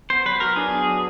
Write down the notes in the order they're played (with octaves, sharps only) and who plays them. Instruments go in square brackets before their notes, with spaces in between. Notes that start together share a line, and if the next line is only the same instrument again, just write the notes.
[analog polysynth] B3 [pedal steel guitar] C5
[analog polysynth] F#3 [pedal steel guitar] B4
[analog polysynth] F#4 [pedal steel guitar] A#4
[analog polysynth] D4 [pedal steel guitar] G#4
[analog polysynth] B3
F#3